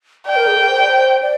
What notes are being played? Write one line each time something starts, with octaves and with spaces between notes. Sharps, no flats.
D5 G5
A#4
G#4
A#4
C5
D5
C5
D5